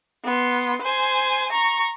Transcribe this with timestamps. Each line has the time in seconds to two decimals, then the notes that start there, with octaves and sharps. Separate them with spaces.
0.24 B3 C6
0.82 C5 G#5
1.52 A#5 C#6